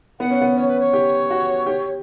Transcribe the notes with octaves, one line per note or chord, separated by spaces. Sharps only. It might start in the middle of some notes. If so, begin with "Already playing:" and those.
B3 F#5
C#4
B3
C#4 C#5
B4
C#5
G4
F#4
G4